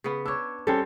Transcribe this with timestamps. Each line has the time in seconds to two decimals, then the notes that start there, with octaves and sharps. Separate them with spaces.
0.04 C#3 B3
0.26 D4 C#5 E6
0.67 G3 C4 C#4 A4